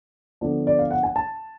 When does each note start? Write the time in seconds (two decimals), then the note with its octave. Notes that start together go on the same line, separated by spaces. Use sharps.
0.41 D3 F3 B3 D4
0.67 D5
0.79 F5
0.91 F#5
1.03 G#5
1.16 A5